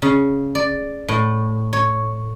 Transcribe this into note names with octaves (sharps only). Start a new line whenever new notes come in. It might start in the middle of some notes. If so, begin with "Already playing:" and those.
C#3
D5
A2
C#5